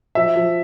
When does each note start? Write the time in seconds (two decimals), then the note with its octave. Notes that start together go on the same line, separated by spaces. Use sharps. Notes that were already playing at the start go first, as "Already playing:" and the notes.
0.15 F3 E5
0.36 F3